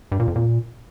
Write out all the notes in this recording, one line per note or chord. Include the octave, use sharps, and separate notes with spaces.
G2
A#2
F2
A#2